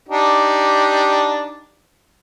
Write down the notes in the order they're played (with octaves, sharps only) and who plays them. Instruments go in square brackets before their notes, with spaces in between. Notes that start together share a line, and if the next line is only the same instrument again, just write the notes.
[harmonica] D4 D#4 G4